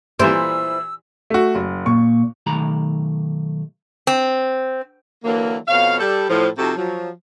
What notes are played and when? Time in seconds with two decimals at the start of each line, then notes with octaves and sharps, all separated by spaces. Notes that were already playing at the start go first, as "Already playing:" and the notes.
0.19 A#2 E3 G3 E4 C5 E6
1.30 A3 F#4
1.55 F#1
1.86 A#2 C#6
2.46 B1 D#3 A3 G4 A#5 B5
4.07 C4
5.25 D3 E3 F#3 A#3
5.68 F2 B2 C#5 F5
6.00 G3 A4
6.28 A2 F3
6.58 C3 F3 D#4 F#4 G4 A4
6.77 F3 F#3